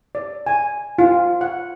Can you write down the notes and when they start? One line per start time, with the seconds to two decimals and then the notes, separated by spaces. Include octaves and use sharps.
0.15 D5
0.47 G#5
0.98 F4
1.41 F#5